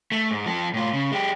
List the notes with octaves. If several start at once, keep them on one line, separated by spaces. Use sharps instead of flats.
A3
G#2
F3 A4
A2 F4
C#3
G#3 G4